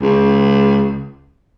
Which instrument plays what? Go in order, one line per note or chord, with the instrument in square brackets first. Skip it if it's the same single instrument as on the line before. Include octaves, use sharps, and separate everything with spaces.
[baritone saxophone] C#2